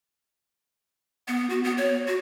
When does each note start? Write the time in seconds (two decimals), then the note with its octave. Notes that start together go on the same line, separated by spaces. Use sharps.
1.28 B3
1.50 F#4
1.64 B3
1.78 C#5
2.08 F#4